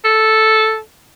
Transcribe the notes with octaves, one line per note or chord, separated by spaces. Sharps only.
A4